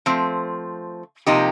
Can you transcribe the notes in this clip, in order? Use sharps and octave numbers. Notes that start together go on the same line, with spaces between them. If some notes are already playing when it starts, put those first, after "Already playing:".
F3 A3 C4
C3 F3 A#3 D#4 G4